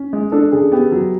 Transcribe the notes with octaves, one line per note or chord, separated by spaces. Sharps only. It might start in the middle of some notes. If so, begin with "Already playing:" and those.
Already playing: C#4
G#3
D4 A4
C#3 G#4
B3 G4
F#3